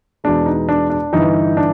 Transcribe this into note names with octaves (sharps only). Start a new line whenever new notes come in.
E2 B2 G#3 D4
D#4
D4
D4
G1 G2 E3 D#4
D4